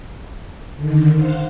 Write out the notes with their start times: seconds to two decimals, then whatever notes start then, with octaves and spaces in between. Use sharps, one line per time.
0.76 D3 D#3
1.16 C5 F5 F#5